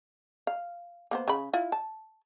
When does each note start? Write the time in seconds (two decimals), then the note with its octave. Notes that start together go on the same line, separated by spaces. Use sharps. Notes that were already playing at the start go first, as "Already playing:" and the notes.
0.47 F5
1.11 A#3 B3 C5
1.28 C#3 B5
1.53 E4 F4
1.72 A5